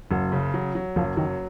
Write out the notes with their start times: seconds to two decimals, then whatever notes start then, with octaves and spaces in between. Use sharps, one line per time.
0.11 F#1 F#3
0.32 C#3
0.54 F#3
0.75 F#3
0.96 F#1 F3
1.17 D#3 F#3